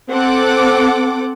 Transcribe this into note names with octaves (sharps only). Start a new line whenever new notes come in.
C4 A4 F#5 D6